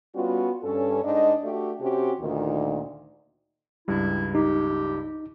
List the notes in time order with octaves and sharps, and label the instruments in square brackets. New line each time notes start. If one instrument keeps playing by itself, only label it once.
[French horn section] G3 B3 C#4 F4 F#4
G2 C#4 A4
G#2 D4 D#4 D#5
A3 D4 F#4 G4
C3 C4 C#4 F#4 G4
D2 A#2 D#3
[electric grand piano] C#2 G2 G3 [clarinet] E4
[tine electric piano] D#4 [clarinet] G4